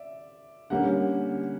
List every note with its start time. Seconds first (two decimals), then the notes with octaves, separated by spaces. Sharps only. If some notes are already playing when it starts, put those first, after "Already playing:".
Already playing: D5 E5
0.70 D3 G3 A#3 C#4 F#5